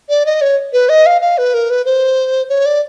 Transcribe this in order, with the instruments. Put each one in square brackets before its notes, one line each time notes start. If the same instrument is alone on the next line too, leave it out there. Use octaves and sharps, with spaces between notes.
[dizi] D5
D#5
C#5
B4
D#5
F5
F5
B4
A#4
B4
C5
C#5
D5